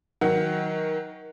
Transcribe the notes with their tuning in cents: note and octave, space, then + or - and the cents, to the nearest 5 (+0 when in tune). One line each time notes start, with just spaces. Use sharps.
D#3 +20 F#3 +0 F#5 +10